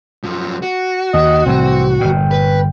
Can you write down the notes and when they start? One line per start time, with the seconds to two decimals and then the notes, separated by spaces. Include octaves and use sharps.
0.24 F#2 F3
0.62 F#4
1.14 D#2 D#5
1.46 C2 A2 E3 C4
2.00 G1 A#2 G5
2.31 B4